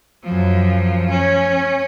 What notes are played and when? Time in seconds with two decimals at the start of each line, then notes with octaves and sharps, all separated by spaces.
0.23 F#2 F3
1.10 C#4